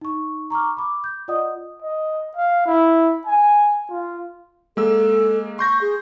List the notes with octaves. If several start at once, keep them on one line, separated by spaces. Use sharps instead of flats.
D#4 C#6
A#5 C#6 D6 F6
B5 D6
G6
F4 D5 D#5 F#5 D#6
D#5
F5
E4
G#5
F4
G#3 A#3 A4 E6
C6 C#6 G6 A#6
G#4